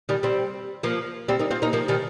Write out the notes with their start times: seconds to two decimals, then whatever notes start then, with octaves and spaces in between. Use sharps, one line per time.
0.09 D#3 G3
0.23 G3 C4
0.83 F3 A#3
1.28 G3 C4
1.39 A#3 D#4
1.51 C4 F4
1.62 A#3 D#4
1.73 F3 A#3
1.88 D#3 G3